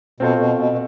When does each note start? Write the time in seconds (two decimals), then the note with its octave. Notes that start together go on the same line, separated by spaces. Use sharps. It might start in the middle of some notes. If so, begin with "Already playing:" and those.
0.20 B2 C4 F4 A4 C5
0.39 B2
0.58 B2
0.72 B2